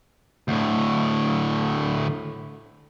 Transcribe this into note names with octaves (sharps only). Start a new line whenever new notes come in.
D2 A2